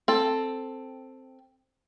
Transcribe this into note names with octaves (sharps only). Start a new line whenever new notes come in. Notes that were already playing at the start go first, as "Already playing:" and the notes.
C4 A4